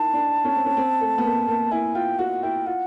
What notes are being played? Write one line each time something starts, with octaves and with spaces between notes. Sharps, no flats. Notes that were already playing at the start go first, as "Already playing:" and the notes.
Already playing: D#4 E4 A#4 A5
D4
C#4
C4
C#4
C4
A3
B3
A#3
A#3
E4 G#5
F4 G5
F#4 F#5
E4 G5
F4 F#5